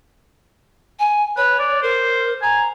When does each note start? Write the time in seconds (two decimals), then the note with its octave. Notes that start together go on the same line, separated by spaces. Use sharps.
0.99 G#5
1.37 B4 C#5
1.59 D5
1.82 A#4 C5
2.42 G#5 A#5